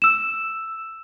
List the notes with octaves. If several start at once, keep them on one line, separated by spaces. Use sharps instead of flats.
E6 E7